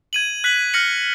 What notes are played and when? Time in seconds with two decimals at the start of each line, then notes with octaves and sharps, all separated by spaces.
0.13 G#6 D#7 F#7
0.44 F#6 B6 F#7
0.74 F6 A#6 C#7 F#7